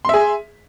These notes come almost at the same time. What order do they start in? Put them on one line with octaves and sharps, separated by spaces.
C6 E5 G#4